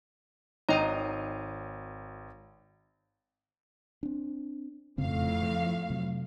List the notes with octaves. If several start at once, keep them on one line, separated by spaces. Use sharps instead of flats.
G#1 D#4 C#5 G5 A#5 D#7
C4 D4
E1 F2 A2 C#3 C4 F5
F3
C3 F#3